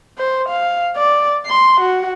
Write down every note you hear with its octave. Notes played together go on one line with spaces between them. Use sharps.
C5
F5
D5
C6
F#4